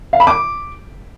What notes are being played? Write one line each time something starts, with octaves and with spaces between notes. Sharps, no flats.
F5
B5
D6